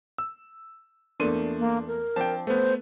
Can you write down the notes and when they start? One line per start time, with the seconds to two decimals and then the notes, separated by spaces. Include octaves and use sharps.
0.18 E6
1.20 E2 A#2 A3 D4 C6 D#7
1.59 A#3
1.88 A#4
2.16 F3 C4 D4 G5 A5
2.47 A3 B3 C5